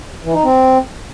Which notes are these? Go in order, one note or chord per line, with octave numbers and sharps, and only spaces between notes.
E3
D#4
C4